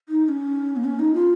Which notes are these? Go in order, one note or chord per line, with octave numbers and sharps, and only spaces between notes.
D#4
D#4
C#4
A#3
C#4
D#4
F4